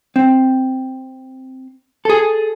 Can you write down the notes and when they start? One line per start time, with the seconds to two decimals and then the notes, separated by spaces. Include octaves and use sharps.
0.16 C4
2.05 G#4 A4